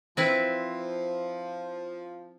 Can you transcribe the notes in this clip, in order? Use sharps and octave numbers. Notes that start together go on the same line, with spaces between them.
F3 C4 E4 B4